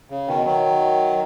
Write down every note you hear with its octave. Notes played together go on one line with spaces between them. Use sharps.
C#3
B2 D#3
D#3 F#3